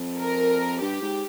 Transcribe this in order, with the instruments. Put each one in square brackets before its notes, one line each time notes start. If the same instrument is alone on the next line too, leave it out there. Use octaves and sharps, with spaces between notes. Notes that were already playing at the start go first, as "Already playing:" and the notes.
Already playing: [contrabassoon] F2
[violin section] A#4
[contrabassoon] G2 [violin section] G4
[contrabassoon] G#2